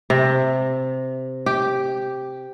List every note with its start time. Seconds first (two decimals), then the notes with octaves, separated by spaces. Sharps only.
0.10 C3
1.46 G4